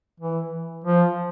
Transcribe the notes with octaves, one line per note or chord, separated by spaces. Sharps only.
E3
F3